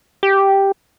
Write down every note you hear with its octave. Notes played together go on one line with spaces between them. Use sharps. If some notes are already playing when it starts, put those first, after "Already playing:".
G4